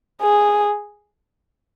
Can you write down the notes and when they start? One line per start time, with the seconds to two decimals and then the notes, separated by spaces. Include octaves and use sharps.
0.22 G#4